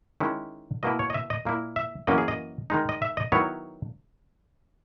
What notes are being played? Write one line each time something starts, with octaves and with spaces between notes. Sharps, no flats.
D#3 G#3 C#4 E4
B2 A#3 E4 D#5
C#5
D#5
E5
D#5
A#2 A#3 E4
E5
F#2 E3 A#3 C#4 D#5
G#4
D#5
D#3 G#3 D#4
D#5
E5
D#5
D#3 F#3 B3 E4 C#5